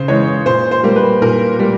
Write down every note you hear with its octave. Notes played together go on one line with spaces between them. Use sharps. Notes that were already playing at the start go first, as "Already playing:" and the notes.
Already playing: C#3 C5
E3 G#3 C#5
A#2 C5
C5
G3 A#3
B4
A#2 A#4
G3 A#3